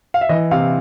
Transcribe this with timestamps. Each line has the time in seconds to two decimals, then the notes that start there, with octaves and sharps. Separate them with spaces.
0.14 F5
0.21 E5
0.29 E3 D#5
0.51 C3 F5